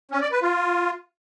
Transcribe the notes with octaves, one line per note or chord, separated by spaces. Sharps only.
C#4
D5
B4
F4